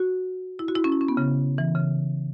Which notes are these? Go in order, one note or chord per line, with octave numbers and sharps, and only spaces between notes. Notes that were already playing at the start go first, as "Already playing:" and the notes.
Already playing: F#4
E4
F#4
E4
C#4
E4
C#4
B3
C#3
E3
C#3